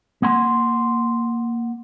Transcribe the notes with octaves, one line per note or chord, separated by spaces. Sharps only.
A#3 F#5 C6